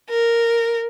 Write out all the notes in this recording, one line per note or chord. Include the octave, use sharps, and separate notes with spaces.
A#4